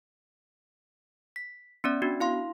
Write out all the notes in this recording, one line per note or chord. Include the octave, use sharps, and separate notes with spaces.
B6
B3 C#4 D5
B3 D4 F#4
E4 F5 C6